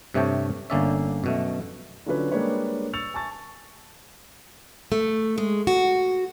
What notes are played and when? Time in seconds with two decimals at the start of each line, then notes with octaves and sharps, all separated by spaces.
0.14 G2 C3 A3 C#5 G5 A5
0.70 G1 D3 A#3 C#4 D5 E5
1.24 F#2 B2 A3
2.06 D3 F3 F#3 C#4 D4 B4
2.31 G3 G#3 A#3 D4 B4 C#5
2.93 C#6 E6 A6 C#7 F7
3.14 G#5 A5 C#6 A6
4.92 A3
5.38 G#3
5.67 F#4